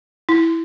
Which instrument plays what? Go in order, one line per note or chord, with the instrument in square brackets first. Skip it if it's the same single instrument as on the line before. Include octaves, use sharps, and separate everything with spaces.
[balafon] E4